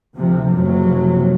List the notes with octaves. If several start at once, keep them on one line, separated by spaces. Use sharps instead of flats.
D2 C3 F3
F#1 C3 F3 F#3